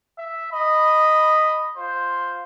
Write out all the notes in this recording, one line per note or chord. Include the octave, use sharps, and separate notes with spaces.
E5
D#5 B5
F4 C5